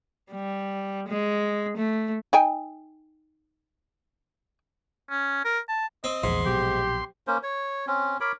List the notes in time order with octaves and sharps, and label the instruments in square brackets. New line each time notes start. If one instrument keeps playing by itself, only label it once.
[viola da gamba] G3
G#3
A3
[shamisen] D#4 G5 G#5
[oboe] C#4
A#4
A5
[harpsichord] C4 [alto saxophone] D#5
[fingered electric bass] A#1 E2 [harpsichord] G#2 [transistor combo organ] C6
[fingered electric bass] A#1 B2 F#3 [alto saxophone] G4
[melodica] A#3 C#4 C5
C#5
C4 C#4
A#4 C#5 B5 D6